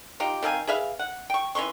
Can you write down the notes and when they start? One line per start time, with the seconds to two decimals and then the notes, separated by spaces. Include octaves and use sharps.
0.20 D#4 F4 G4
0.43 D#3 C4 F5 G#5
0.67 G#4 B4 E5 F5
0.99 F#5
1.30 G5 C#6
1.55 E3 C#4 C6 C#6